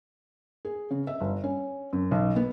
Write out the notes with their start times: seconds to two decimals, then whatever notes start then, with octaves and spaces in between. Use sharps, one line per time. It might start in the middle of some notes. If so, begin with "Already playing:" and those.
0.65 G#4
0.91 C#3
1.07 E5
1.21 G1
1.44 C#4
1.93 F#2
2.11 B1
2.36 B3